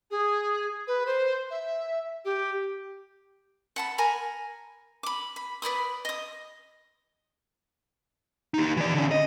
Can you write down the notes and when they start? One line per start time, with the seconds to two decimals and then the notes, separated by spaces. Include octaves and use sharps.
0.10 G#4
0.87 B4
1.06 C5
1.50 E5
2.25 G4
3.76 F#5 A5 B5
3.98 A#4 G#5 A#5 B5
5.03 B5 D6
5.36 B5
5.62 B4 D5 B5 D#6
6.05 D#5 D#6
8.54 D#4 G4
8.77 E3 D5
8.94 D3 C#4
9.11 D#5